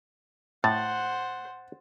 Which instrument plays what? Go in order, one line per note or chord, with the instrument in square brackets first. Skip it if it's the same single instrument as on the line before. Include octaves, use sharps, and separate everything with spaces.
[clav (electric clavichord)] A2 [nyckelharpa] C5 F#5 [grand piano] A6